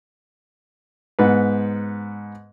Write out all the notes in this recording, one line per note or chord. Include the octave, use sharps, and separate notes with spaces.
G#2 B3 B4